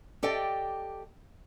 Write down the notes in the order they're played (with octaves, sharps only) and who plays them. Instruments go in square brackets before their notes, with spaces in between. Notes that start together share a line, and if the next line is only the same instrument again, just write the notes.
[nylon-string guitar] G4 A4 D5 D#5 G5